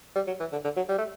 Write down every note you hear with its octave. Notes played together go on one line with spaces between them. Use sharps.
G3
F#3
E3
D3
D3
F#3
G3
A3